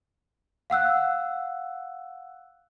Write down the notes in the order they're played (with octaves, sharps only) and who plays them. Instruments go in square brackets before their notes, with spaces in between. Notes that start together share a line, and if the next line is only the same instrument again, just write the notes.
[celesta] F5 F#5 E6 F#6